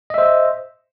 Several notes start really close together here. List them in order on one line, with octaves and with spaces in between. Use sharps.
D#5 E5 C5